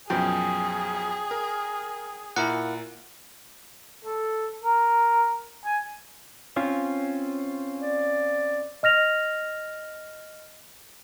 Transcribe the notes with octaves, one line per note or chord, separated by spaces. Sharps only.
F#2 B2 F3 G#4 G5
A#4
A#2 E4 A#4 F#5
A4
A#4
G#5
C4 C#4 F4
D5
D#5 F6 A#6 F7